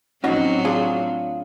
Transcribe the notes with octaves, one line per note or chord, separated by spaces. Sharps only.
A2 F#3 C4 C#4 D#4 F#4
D4 F4 G#4